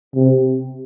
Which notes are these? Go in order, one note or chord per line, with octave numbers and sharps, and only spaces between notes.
C3